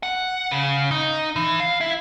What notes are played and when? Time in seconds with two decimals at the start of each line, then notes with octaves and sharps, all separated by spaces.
0.03 F#5
0.51 C#3
0.91 D#4
1.36 E3
1.60 F5
1.81 E4